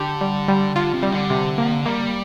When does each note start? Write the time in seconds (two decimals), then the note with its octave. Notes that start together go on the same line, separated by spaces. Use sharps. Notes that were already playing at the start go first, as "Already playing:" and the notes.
Already playing: D3 G4
0.21 G3
0.48 G3
0.76 D3 F4
0.94 C3
1.03 G3
1.12 D3
1.30 C3
1.58 A#3
1.86 G3 A#3